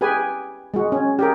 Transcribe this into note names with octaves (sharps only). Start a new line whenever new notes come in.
G4 G#4 B4 G#5
G#3 F#4
C#4
G4 G#4 A#4